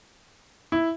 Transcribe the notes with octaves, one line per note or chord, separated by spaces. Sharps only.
E4